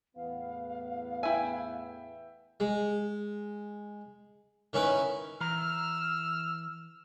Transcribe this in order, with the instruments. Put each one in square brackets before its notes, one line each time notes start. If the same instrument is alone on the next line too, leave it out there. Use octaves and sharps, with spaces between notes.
[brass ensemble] E2 A2 B3 [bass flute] F5
[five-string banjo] E4 G#5 [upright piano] E5 G5
[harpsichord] G#3
D#3 C#4 E4 B4
[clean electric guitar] E3 A#5 [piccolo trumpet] E6 [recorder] F6